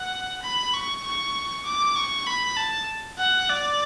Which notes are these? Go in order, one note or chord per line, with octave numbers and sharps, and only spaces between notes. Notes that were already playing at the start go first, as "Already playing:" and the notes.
Already playing: F#5
B5
C#6
C#6
D6
C#6
B5
A5
F#5
D5